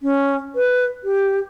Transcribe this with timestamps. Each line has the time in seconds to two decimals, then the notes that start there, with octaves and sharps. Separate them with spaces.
0.02 C#4
0.55 B4
1.04 G4